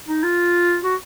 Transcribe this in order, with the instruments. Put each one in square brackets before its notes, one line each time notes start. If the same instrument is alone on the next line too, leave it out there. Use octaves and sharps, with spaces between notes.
[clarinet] D#4
F4
F#4